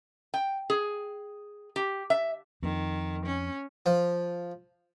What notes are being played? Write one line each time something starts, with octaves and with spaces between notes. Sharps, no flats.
G5
G#4
G4
E5
F2 D#3
C#4
F3